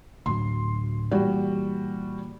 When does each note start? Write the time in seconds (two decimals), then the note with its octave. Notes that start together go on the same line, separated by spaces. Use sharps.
0.26 D2 A2 F#3 C6
1.12 A#2 E3 G3 F#4